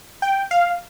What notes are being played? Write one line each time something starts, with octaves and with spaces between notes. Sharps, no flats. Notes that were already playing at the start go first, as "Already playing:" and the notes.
G5
F5